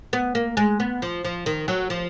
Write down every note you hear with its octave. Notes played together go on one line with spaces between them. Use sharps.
B3
A#3
G#3
B3
F3
F3
D#3
F#3
F3